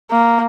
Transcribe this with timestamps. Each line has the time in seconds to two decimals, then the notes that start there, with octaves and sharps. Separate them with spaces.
0.11 A#3